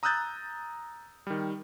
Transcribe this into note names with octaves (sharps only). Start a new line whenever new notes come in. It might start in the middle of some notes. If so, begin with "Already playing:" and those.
A#5 D#6 E6 F#6 G6 A6
D#3 G3